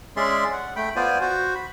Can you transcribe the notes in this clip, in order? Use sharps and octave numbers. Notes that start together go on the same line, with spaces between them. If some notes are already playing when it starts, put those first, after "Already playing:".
G#3 C#4 G#4 D5 E5 C6
F#5
A3 G5 B5
B3 F4 C5 D5 G#5
F#4 C5
B5